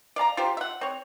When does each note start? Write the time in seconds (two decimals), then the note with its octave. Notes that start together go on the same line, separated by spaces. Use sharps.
0.16 D5 F5 A5 A#5
0.37 F4 G4 C5
0.57 E5 F#5
0.81 C4 C#5